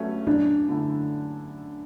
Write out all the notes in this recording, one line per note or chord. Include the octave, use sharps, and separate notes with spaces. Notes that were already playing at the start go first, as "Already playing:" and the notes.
Already playing: G2 F#3 A3 C#4
F#2 D4
D3 A3 E4